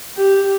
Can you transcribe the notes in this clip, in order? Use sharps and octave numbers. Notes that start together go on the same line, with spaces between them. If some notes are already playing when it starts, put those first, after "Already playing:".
G4